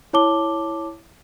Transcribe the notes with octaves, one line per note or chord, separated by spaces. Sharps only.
E4 C#5 A5 D6 G7